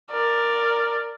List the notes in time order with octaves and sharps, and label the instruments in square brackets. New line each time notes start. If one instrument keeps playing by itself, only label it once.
[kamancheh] A#4 D5